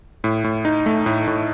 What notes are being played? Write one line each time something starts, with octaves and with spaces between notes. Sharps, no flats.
A2
A2
D#4
A3
A2
A2